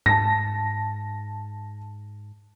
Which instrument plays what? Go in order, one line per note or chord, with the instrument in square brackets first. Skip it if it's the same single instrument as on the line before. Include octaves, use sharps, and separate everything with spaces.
[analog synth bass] G#2 [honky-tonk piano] A5 A#6